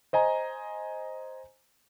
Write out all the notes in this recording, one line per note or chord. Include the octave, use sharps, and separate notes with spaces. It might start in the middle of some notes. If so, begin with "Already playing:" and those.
C5 D#5 G#5 A#5